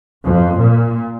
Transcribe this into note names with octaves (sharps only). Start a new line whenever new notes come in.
F2
A#2